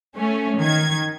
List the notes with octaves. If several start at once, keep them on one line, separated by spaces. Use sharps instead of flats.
A3 C#4
D#3 G#6